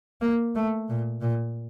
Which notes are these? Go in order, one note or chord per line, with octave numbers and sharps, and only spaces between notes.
A#3
A3
A#2
A#2